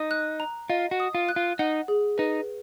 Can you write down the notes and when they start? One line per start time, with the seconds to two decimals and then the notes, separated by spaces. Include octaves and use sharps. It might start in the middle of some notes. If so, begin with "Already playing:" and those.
Already playing: D#4 D#6
0.11 F#6
0.40 A#5
0.69 F4 D#5
0.91 F#4
1.00 D#6
1.15 F4
1.29 F#6
1.36 F4
1.59 D#4 F#5
1.88 G#4
2.18 D#4 B4